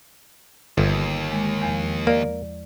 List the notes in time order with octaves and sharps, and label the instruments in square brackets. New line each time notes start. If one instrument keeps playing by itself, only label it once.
[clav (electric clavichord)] G1 [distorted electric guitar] D#2
[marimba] G#3
E2 F3
[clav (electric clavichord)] A#3 [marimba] D5